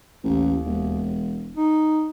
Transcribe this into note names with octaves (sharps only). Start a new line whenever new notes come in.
A1 D#2
E1
D#4